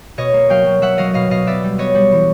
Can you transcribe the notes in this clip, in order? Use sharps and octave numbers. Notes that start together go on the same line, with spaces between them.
B2 C#5 D#5
A#3
F#3 F5 G5
F#3
F#3 E5 F#5
F#3 D#5 F5
B2 D#5 F5
B2 D#5 F5
B3 D5 E5
G3
B3 C#5 D#5
G3
E3